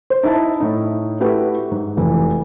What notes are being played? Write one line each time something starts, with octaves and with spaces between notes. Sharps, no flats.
C5
D#4 E4 A5
A2 D#4
A3 E4 F#4 G4 B4
G#2
F1 E3